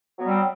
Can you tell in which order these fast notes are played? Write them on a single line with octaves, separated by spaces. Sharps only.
F#3 B3 G3 C4